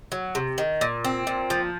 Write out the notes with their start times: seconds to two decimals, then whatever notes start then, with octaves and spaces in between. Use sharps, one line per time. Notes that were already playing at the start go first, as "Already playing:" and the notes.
0.12 F#3
0.35 C3
0.58 D#3
0.81 A#2
1.04 C4
1.27 A#2
1.50 F3